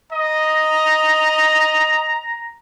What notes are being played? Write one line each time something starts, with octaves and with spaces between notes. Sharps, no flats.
D#5 A#5